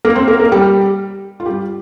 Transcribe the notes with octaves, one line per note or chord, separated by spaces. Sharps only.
A#3 A#4
C4 C5
A#3 A#4
A#3 A#4
G3 G4
F4
G3 G4